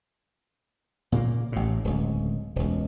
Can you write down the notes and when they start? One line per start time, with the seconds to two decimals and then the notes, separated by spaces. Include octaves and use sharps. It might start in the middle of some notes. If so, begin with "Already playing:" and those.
1.12 A#2 C#3 F3 A#3
1.52 A1 A2
1.84 D1 C#2
2.56 E1 C#2